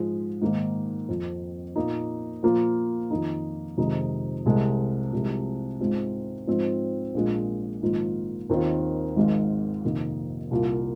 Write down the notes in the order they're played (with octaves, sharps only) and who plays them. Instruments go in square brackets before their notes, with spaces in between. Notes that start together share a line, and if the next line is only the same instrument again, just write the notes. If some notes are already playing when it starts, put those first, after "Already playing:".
Already playing: [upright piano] G#2 F3 G#3
G#2 D#3 A#3
F2 F3 C4
A#2 A#3 D#4
A#2 F3 A#3 F4
F2 D#3 A#3 D#4
F2 C3 D#3 G#3 D#4
C2 C3 G#3
C2 C3 F3 G#3
G#2 G#3 C4 F4
G#2 F3 C4
A#1 A#2 G#3
G#1 G#2 F3 A#3 F4
D#2 D#3 C4 F4
G#1 G#2 F3 G#3 F4
F2 C3 D#3 A#3 D#4
C2 A#2 A#3 F4